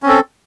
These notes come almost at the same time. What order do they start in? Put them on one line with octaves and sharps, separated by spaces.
C#4 C4 A4